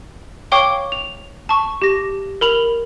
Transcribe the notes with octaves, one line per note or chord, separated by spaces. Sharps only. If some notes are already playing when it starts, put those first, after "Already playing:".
C#5 F5 G5 C#6 D6 G7
F7
A5 C#6
G4 A#6
A#4 B5 F7